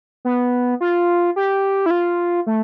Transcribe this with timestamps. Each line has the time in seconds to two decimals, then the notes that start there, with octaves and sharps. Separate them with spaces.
0.25 B3
0.81 F4
1.36 G4
1.86 E4
1.91 F4
2.47 A3